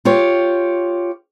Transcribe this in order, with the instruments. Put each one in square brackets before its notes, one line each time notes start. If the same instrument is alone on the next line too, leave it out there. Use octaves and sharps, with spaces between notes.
[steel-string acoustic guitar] F4 G4 C#5